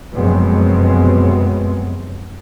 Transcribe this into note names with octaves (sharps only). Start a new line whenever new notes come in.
F1 F#2 B2 G#3 B3 C4